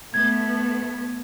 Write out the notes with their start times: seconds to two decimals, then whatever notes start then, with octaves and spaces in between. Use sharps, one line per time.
0.14 A3 B3 G#6